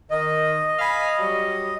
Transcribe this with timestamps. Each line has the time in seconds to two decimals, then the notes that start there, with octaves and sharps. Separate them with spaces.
0.10 D#3 D#5
0.79 F5 G#5 B5
1.19 F#3 G3